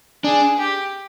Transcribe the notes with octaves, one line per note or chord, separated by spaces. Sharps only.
D4 G#4
G4